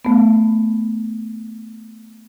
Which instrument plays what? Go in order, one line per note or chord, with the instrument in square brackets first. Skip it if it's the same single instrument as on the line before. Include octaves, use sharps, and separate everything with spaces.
[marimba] A3 B3